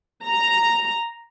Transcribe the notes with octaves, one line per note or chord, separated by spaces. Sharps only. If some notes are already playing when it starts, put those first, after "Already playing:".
A#5